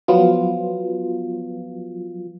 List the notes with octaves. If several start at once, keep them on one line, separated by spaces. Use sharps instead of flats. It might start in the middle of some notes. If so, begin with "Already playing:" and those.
F3 F#3 B3 F4